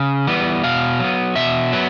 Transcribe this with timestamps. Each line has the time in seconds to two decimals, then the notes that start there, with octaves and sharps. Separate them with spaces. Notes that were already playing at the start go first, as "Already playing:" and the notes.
Already playing: C#3
0.27 E3 G3 B3
0.64 B2 F5
1.00 F#3 B3
1.36 B2 E5
1.72 F#3 B3